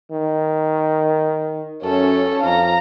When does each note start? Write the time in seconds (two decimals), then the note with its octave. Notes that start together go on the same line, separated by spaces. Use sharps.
0.11 D#3
1.83 F#2 C#4 A4
2.43 F2 F5 A#5